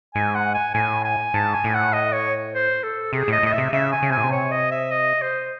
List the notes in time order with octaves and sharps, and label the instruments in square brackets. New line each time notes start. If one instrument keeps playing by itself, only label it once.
[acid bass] G#2 [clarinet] G#5
[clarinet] F#5
G#5
[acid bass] A2 [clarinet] G#5
[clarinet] G#5
[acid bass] G#2 [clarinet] A5
[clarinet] G#5
[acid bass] A2
[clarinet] F#5
D#5
C#5
C5
A4
[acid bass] C3 [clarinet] G#4
[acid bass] A2 [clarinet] D#5
[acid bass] A2 [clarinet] D#5
[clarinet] E5
[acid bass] C3
[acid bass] C#3 [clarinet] E5
[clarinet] G#5
[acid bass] C#3
[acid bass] C3 [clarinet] G#5
[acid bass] A2
C3
[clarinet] C#5
D#5
E5
D#5
C5